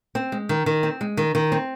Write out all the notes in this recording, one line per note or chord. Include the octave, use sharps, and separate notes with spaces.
C4
G#3
D#3
D#3
C4
G#3
D#3
D#3
C4